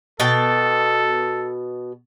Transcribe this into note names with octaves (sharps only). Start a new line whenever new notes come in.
B2 A4 G5 A5